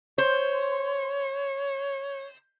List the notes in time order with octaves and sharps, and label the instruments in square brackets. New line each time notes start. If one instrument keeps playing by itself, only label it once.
[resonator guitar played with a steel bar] C5 [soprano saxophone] C#5